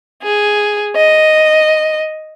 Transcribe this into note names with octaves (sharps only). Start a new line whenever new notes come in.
G#4
D#5